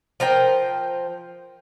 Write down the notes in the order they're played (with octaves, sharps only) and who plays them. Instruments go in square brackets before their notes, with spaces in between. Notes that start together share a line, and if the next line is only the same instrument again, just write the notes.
[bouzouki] F3 A#4 C5 G5